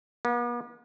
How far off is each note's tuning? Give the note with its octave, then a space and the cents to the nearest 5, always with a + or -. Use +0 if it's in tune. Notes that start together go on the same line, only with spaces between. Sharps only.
B3 -45